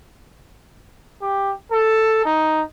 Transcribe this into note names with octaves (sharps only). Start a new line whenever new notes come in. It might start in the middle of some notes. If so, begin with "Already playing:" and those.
G4
A4
D#4